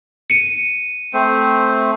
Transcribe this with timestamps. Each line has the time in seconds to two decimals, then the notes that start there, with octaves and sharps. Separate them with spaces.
0.30 C#7 D#7
1.14 A3 C4 C5